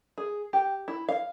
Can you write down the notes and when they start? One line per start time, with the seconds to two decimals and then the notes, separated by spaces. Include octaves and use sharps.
0.18 G#4
0.53 G4
0.88 E4
1.09 F5